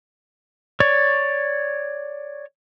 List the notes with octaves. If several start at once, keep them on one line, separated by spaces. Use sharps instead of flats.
C#5 D5 C#6